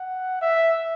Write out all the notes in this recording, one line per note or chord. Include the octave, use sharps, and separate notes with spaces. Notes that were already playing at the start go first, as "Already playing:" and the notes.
Already playing: F#5
E5